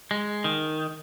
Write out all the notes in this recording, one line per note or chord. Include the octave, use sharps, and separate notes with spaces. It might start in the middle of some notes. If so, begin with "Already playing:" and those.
G#3
D#3